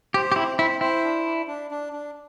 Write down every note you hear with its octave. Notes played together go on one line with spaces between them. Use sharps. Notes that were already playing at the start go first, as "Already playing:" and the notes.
G4 C5
G4
C4 E4
E4 C5
E4 C5
D4
D4
D4
D4
D4